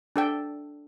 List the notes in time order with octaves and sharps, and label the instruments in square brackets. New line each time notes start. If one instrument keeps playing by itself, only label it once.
[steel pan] D4 A4 G5